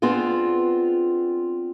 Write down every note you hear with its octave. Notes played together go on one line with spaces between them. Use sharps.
B3 C4 D4 F4 G#4